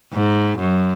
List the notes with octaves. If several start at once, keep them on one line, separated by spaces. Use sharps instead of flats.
G#2
F#2